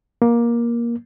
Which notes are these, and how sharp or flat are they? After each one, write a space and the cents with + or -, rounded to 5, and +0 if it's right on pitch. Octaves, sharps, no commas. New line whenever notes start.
A#3 +15